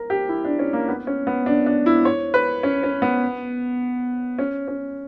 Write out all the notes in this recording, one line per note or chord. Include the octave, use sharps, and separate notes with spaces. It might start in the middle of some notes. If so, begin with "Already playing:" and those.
Already playing: A#4
G4
E4
D4
C#4
A#3
B3
C#4
B3
D4
D4
E4
C#5
B4
C#4
C#4
B3
C#4
C#4